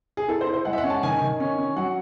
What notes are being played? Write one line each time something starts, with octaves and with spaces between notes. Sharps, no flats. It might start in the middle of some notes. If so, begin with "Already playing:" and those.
G#4
E4 A4
C5
E4
C5
G#3 F#5
E5
F#5
C#4
A5
D#3 G#5
D#3
C#4
C#4
F#3 F#5